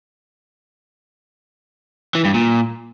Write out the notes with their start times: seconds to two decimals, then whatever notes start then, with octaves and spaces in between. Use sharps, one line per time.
2.15 E3
2.25 G2
2.34 A#2